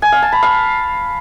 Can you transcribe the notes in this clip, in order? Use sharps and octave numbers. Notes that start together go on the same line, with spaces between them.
G#5
F5
A5
B5
F5